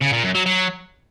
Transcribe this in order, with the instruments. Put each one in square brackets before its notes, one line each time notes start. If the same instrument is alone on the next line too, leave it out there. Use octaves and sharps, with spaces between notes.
[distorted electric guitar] C#3
A#2
F#2
F#3
F#3